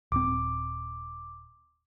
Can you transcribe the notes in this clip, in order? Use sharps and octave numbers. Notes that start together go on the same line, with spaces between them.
D#1 C4 D6